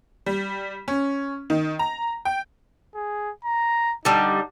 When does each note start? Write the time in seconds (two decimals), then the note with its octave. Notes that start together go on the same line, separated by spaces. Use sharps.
0.26 G3
0.88 C#4
1.50 D#3
1.79 A#5
2.25 G5
2.95 G#4
3.44 A#5
4.05 D3 G3 D#4